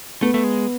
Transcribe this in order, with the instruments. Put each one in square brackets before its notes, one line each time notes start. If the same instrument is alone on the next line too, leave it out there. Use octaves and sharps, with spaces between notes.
[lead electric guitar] A3 [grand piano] B3
[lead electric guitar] A3
G#3